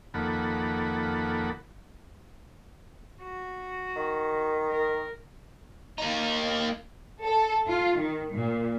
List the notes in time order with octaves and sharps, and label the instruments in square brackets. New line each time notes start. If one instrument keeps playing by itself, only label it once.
[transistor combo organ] F2 D#3 A#3 A4 F#5 B5
[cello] F#4
[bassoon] D#3
[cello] A#4
[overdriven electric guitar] A#3 D#4
[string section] A4
F4
D#3
A#2